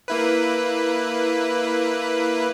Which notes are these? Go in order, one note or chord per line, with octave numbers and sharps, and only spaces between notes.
A#3 E4 B4